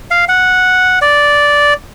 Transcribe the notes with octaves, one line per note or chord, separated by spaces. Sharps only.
F5
F#5
D5